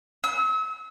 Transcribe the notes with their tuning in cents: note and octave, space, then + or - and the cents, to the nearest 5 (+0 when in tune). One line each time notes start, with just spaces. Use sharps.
E6 -40